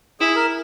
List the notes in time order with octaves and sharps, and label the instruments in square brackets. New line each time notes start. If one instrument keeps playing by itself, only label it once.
[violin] E4 [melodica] G#4
[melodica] A#4